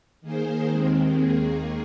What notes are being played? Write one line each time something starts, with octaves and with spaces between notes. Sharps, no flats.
D#3 A#3 G#4 C5
D#2 D#3 G#3 C4
D#2 D#3 A#3 G#4